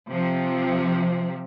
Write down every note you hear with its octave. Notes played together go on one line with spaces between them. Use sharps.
C3 F3